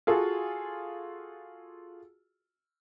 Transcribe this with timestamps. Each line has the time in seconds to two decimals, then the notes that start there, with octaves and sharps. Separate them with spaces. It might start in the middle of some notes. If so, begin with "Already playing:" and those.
0.07 F4 F#4 G#4 A4